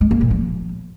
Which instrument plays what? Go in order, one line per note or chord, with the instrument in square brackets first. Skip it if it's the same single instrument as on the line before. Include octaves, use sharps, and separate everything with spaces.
[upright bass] G#3
A#3
A#2
F3